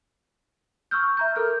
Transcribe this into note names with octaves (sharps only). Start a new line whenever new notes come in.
C#6 E6 F6 G6
E5 A#5 G6
A4 A#4 F6 G6